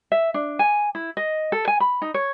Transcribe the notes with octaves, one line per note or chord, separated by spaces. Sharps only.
E5
D4
G#5
E4
D#5
A4
G#5
B5
D#4
C#5